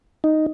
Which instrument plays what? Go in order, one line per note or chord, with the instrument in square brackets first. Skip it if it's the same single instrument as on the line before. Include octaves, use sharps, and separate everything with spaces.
[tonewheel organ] D#4